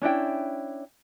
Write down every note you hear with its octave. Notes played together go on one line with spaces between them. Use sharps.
C#4 D4 E4 G5